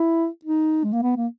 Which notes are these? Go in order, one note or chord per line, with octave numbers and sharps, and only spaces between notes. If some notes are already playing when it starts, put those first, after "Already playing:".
Already playing: E4
D#4
G#3
A#3
B3
A#3